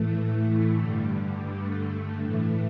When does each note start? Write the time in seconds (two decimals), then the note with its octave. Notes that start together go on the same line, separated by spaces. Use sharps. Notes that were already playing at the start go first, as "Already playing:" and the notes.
Already playing: A2 E3 A3
0.77 G2 D3 G3
1.51 A3
2.22 A2 E3 A3